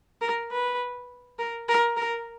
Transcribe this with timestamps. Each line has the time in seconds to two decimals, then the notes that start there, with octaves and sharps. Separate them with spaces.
0.21 A#4
0.51 B4
1.39 A#4
1.69 A#4
1.97 A#4